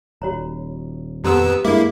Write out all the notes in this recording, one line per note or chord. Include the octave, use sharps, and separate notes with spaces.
D#1 F#4 C#5 A#5
F2 B3 G4 A#5 C6 E6
G2 G#3 A#3 E4 D6